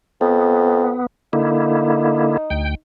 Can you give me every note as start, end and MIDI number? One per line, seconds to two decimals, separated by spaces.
0.21 0.94 41
0.21 1.06 59
1.33 2.37 50
1.33 2.37 58
1.33 2.75 63
1.33 2.37 64
2.50 2.75 38
2.50 2.75 79